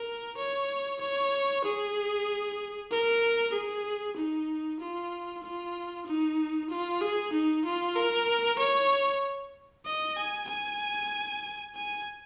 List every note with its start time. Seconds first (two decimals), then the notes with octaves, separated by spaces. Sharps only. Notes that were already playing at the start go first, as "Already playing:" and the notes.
Already playing: A#4
0.38 C#5
1.00 C#5
1.64 G#4
2.91 A#4
3.53 G#4
4.16 D#4
4.79 F4
5.43 F4
6.06 D#4
6.70 F4
7.01 G#4
7.32 D#4
7.64 F4
7.96 A#4
8.59 C#5
9.85 D#5
10.17 G#5
10.48 G#5
11.75 G#5